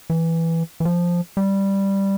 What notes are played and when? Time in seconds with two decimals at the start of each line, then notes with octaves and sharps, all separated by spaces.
0.10 E3
0.80 E3
0.85 F3
1.37 G3